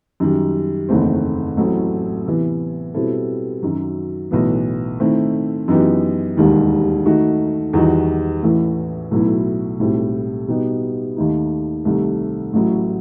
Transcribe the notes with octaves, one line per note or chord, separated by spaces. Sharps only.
F#2 D#3 G3
F#1 E2 D#3 A3 C4
A1 A2 F#3 A3 C4
C3 E3 B3
B2 G3 C4 E4 A4
F#2 D#3 F#3
B1 A2 E3 B3
D#3 A3 C4 E4
F#2 E3 B3 D#4 G4
E1 D#2 D#3 G3
D#3 A3 D#4 F#4
E2 D#3 G3 D#4 F#4
A1 A2 E3
B1 A2 F#3 B3 E4
B1 A2 G3 C4
B2 G3 B3 D#4 G4
D#2 D#3 A3 D#4
C2 C3 D#3 A3
A1 A2 F#3